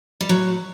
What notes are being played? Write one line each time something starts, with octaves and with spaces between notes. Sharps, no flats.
G3
A2 F#3